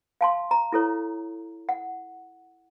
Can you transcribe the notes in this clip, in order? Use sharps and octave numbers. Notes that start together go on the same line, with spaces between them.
F5 A5 C6
A#5
E4 A4 C#5
F#5